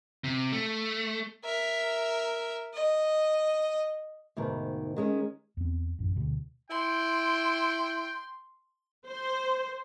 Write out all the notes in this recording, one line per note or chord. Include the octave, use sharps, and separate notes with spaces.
C3
A3
A#4 E5
D#5
D2 G#2 B2 D#3
D#3 G#3 C#4
E2 C4
A1 F#2
D2 B2
E4 G5 C6
C5